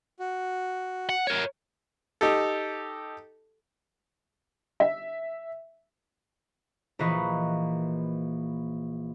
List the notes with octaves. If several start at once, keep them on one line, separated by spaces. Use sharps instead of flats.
F#4
F#5
A#4 C#5
D#4 G4 A4
E5
A#1 E3 A#3 B4 D#5 C#6